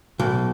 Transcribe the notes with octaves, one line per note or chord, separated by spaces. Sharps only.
B1